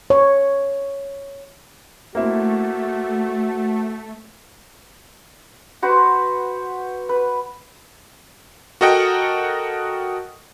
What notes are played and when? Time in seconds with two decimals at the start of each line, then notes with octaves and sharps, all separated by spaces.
0.10 C#5
2.15 A3 A#3 C4 E4 F#4
5.83 F#4 B4 C5
7.09 B4
8.81 F#4 A4 A#4 D#5 F#5 G5